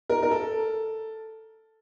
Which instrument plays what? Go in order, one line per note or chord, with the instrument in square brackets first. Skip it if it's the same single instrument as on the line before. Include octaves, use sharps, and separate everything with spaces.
[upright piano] A#4
A#4
A4